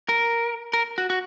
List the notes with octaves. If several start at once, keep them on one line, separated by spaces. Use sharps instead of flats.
A#4
A#4
F#4
F#4